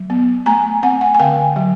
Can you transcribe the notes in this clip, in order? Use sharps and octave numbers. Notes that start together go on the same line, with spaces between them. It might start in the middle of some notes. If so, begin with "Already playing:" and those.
Already playing: F#3
B3
A3 G#5 A#5
C4 F#5 G#5
F#5 G#5
G#5
D3 F5 G5
F#3